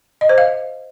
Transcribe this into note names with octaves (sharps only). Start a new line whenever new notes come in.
D#5
C5
F5